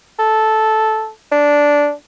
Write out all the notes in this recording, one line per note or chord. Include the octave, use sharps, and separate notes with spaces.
A4
D4